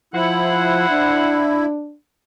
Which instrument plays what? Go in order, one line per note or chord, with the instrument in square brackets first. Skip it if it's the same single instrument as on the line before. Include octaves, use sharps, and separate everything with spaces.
[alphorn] F3 [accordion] E4 [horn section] C5 F#5
[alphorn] D4